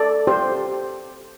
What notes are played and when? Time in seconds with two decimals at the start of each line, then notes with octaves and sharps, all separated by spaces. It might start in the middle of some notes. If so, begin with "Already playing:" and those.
Already playing: A4 D5
0.27 G4 C5